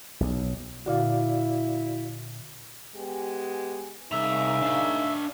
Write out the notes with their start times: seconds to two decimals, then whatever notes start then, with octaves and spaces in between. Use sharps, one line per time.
0.20 B1
0.86 A#2 D3 E4 F#4 D5 F5
2.94 G#3 B3 G4
4.12 C2 C#3 A#3 D#4 E5 A#5
4.62 D4 F5